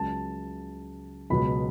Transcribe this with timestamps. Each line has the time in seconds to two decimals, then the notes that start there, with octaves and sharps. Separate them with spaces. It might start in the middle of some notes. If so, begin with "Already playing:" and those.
Already playing: C#2 C#3 F#3 A5
1.30 C#2 B2 F#3 B3 B5